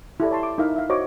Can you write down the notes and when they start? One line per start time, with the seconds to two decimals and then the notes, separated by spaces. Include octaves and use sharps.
0.20 E4 G4 A4 D5
0.31 C#5 A5 C6
0.43 D6
0.58 D#4 E4 A#4 E5 F5
0.76 E5 F5
0.89 F#4 C5 C#5 D#5 F5 D6